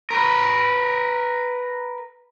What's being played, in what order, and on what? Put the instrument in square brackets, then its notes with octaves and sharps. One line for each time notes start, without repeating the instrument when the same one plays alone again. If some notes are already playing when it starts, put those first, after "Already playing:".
[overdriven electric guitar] A#4 B4